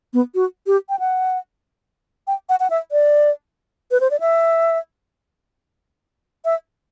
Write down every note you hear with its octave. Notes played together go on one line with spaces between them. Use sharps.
B3
F#4
G4
G5
F#5
G5
F#5
F#5
E5
D5
B4
C5
D5
E5
E5